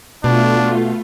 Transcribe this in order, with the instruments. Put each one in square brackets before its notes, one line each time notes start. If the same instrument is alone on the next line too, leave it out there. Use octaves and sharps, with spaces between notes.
[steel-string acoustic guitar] B2 [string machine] A3 F4 [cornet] D4